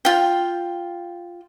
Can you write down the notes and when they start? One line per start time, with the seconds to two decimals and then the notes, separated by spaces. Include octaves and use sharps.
0.05 F4 G5